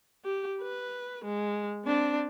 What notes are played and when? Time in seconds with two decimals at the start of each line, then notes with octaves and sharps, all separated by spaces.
0.25 G4
0.61 B4
1.24 G#3
1.85 C4 D4